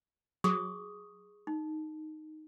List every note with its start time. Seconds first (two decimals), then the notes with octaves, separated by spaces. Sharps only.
0.44 F#3 G#4 C#6 D#6
1.47 D#4